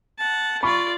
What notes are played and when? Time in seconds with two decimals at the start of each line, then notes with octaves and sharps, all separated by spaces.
0.19 F#5 A5
0.63 F4 D5 B5 C#6